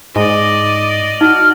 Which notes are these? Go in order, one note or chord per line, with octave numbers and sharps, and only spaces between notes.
G#2 D5 D#5
D#4 F#4 F6